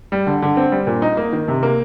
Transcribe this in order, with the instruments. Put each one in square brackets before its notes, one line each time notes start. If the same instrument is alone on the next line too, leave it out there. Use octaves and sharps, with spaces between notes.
[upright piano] G3
D3
D3
C4
G3
A#2
D#4
A#3
D#3
C3
A#3